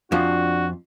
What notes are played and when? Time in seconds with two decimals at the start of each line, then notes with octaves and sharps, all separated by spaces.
0.12 F2 F3 D4 F#4